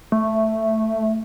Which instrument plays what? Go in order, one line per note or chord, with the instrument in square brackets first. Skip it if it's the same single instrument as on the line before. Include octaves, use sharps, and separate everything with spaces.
[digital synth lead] A3